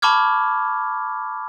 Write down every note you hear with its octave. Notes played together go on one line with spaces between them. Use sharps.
A5 B5 C#6 D6 F6 G#6